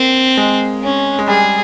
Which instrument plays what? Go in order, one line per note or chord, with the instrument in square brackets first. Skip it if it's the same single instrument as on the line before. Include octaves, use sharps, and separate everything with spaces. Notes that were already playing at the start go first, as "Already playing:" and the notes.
Already playing: [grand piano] A#3 [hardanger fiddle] C4
[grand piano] G#3
[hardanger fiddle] C#4
[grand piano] G#3
[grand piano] G3 [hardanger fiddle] G#4